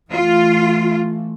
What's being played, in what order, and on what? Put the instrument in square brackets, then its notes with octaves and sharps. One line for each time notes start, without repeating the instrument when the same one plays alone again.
[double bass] E3 A3 [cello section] F4